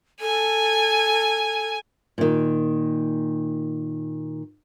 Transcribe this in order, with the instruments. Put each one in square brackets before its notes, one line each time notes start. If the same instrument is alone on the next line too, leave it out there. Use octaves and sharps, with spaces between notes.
[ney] A4 [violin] G#5
[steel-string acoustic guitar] A#2 D#3